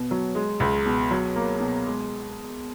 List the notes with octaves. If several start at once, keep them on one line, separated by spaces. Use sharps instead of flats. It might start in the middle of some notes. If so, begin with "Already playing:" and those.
Already playing: B2 B3
F#3
G#3
C#2
B2
F#3
A#3
B2
G#3